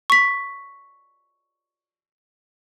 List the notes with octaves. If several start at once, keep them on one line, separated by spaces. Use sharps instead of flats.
C#6 B6